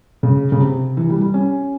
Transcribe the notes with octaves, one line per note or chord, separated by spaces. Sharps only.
C#3
C#3
C3
E3
G3
G3
C#4